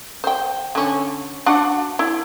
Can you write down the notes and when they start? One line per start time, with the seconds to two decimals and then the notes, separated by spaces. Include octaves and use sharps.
0.24 C5 G5
0.75 D3 C#4
1.46 D4 F#4 F#5
1.99 E4